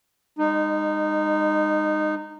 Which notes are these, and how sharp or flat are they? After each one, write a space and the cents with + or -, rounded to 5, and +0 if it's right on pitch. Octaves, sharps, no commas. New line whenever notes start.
G#3 -40 D#4 -15